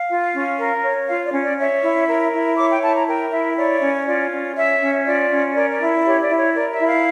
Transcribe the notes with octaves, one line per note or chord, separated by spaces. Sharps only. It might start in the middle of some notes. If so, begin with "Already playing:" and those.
Already playing: F5
F4
C#4
A#4
C#5
F4 F5
D5
C#4
D5
C#5 E5
E4
A#4
E4
C#5 D6
G5
E4 A5
A#5
A#4 G5
E4 E5
C#5 D5
C#4
F4 D5
C#4
C#5 E5
C#4
F4 D5
C#4
A#4 D5
D5
E4
G4 C#5
D5
E4
C#5
A#4 D5
E5
E4
F5